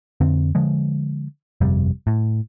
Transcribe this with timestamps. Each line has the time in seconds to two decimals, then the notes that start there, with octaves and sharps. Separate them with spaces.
0.21 F2 D3 C4
0.55 D3 F3 G#3
1.61 G1 F2 C3 G3
2.07 A2